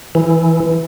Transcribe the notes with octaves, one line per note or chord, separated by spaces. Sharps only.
E3